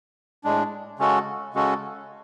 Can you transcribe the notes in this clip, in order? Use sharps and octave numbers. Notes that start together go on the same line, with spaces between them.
A2 G#3 D4
C#3 G#3 C#4 F#4 A4
C#3 G#3 C#4 F#4 A4